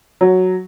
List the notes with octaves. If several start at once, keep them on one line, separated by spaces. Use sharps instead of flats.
F#3